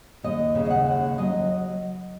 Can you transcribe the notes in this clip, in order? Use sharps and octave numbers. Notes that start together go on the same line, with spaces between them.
D#2 D#5
C#3
D#5
F#5
D#2
F#3 D#5